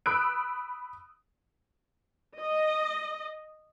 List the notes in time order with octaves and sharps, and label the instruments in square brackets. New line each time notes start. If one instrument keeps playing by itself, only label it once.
[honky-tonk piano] B5 D#6 E6 F#6 D7
[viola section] D#5